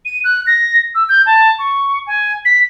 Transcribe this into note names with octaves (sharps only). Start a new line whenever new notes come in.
D#7
F#6
A#6
E6
G6
A5
C#6
G#5
B6